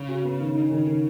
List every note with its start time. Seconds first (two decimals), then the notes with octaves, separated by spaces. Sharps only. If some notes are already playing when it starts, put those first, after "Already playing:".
Already playing: C#3
0.08 F#4
0.24 B3
0.40 D#3
0.55 D#4
0.71 D#3
0.87 D#3